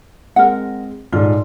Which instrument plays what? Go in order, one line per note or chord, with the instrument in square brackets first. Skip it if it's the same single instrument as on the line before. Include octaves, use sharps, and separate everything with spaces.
[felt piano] G#3 C4 [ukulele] A#4 F#5
[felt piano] D#1 G#2 D5 [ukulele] F4